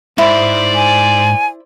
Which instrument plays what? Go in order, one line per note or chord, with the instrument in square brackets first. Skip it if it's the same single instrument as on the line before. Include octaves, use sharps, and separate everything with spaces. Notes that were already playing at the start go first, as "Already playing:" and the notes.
[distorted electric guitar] G#2 [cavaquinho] E4 [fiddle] C5 D5
[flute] G#5